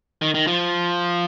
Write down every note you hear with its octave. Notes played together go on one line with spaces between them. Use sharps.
D#3
D#3
F3